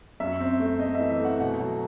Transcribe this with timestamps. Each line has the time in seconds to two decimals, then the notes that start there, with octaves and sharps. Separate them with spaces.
0.20 F#2 E5
0.40 C4
0.59 A3
0.80 A3 D#5
0.95 E5
1.00 E3
1.10 E5
1.20 A3
1.25 F#5
1.40 B2 F#5
1.59 F#3